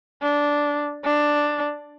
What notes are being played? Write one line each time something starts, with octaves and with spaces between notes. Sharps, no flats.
D4
D4